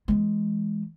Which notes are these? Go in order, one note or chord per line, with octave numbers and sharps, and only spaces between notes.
E3 G#3